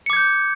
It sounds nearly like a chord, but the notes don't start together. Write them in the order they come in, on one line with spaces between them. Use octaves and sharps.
C#7 D6 G#6 G6